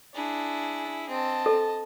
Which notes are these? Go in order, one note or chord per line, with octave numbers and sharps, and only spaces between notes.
D4 E4 G#4
C4 D#5 A5
A4